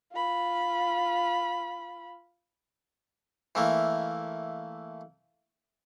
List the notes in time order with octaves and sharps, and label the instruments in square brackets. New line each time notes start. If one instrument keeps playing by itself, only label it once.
[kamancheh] F4 B5
[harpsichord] E3 A3 A#3